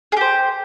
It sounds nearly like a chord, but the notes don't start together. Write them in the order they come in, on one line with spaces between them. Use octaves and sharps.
G#4 G4 C5